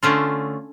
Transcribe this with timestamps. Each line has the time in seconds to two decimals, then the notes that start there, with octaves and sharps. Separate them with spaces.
0.03 D3 A3 C#4 F4